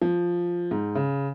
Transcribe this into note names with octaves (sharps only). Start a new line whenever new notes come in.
F3
G#2
C#3